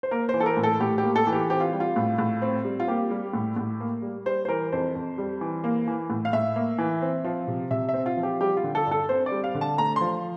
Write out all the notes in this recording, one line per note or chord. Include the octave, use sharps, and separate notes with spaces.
C5
A#3 A#4
C5
E3
A4
A#4
A2
A4
A2 G4
G4
A#3
A4
E3
G4
C4 G4
F4
G3
F4
A2
A2
C4
G3
F4
A#3 G4
G3
A2
A2
A#3
G3
G3 C5
C5
E3 A#4
F2 C5
F2
G3
E3
A#3
E3
A2
F5
A2 E5
A#3
E3
C4
F3
C3
C3 E5
E5
C4
F4
F3
G4
G3 G4
F4
D3
A4
G2
A4
C4 C5
D5
G3
F5
D3
A5
A3 A#5
F3 C6